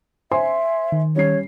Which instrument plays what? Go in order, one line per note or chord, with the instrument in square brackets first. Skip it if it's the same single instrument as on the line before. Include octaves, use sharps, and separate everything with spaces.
[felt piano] C5 G#5 C6 [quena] E5
[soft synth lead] D#3
[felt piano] G3 C#4 C7 [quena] C#5